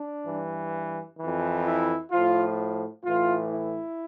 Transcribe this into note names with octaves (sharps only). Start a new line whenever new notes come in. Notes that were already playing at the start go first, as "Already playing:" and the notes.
Already playing: D4
G2 E3
F2 E3
E4
A2 F3 F4
A2 E3 F4
E4